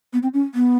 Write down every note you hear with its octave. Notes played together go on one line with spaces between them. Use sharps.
B3
C4
C#4
B3